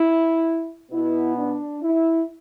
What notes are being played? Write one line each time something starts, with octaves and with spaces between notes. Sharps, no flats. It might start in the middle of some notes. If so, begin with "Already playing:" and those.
Already playing: E4
B2 B3 E4
D4
E4